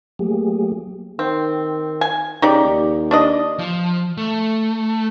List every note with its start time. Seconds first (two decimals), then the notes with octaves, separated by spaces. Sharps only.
0.19 F#3 A3 A#3 G4 G#4
1.19 D#3 C4
2.01 G#5
2.42 C#3 D#4 G4 D5
2.64 D#2
3.11 D4 D5 D#5
3.59 F3
4.17 A3